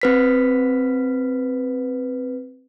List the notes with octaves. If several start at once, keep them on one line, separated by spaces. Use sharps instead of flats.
C4 B4 B6